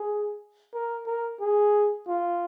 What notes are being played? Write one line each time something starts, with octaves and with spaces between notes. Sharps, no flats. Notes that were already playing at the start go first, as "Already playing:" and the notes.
Already playing: G#4
A#4
A#4
G#4
F4